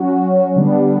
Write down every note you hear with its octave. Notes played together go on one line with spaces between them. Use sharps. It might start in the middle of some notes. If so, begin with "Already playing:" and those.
Already playing: F#3 C#4 F#4
D3 G3 B3 D4